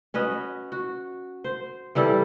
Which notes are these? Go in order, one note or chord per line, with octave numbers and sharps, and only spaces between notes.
C#4 F#4 B4 D#5
F#4
C5
E3 G3 E4 A4